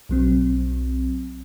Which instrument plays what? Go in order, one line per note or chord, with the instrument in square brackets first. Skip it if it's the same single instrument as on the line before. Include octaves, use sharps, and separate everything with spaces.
[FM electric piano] B1 F#3 C4